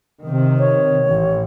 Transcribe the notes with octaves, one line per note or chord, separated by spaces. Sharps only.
C3 D#3
C#5
A1